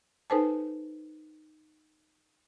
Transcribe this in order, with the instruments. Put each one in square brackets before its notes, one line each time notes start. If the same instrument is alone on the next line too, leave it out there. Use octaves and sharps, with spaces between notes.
[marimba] D#4 A4 B4 C5 G#5 A5